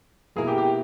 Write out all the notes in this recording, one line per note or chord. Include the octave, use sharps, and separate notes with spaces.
B2 A#3 E4 G#4 A#4
G4
G4